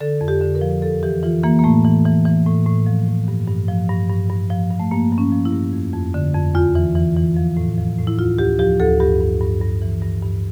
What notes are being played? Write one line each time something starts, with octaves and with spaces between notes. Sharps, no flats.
D3 A4
F2
G4
D3
A#4
F3
E2 A4
E3 G4
E3 F4
E3 A#3
A#3
A2 A3
E3
E3
E3
A2
A2
F3
A2
G2
G2
F3
G2
G2
G2
F3
G2
A3
G2 A#3
G2
C#4
F3
E4
G2
F2
F2
D3
F2
E2 F4
E3
E3
E3
F3
A2
F3
A2
E4
D2 F4
D2 G4
F3 G4
D2 A4
G2 G4
G2
G2
G2
E3
G2
G2